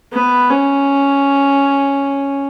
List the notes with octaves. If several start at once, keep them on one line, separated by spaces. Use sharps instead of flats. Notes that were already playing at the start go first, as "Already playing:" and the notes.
B3
C#4